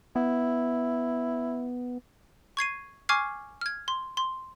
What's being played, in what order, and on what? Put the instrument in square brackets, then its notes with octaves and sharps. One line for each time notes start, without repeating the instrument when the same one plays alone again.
[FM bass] B3 [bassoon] E4
[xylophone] C#6 G#6 C7 D#7
G#5 C#6 D6 F6 G#6 C7
F6 G#6
C6
C6